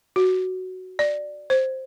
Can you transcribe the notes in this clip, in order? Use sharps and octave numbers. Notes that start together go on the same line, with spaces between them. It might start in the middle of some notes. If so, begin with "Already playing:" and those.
F#4
D5
C5